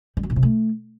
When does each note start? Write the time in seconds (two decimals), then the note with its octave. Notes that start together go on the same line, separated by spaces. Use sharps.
0.17 G3
0.23 F#3
0.30 A2
0.36 C3
0.43 A3